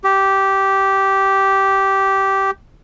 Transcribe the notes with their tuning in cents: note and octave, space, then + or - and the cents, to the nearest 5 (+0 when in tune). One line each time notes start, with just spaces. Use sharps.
G4 -10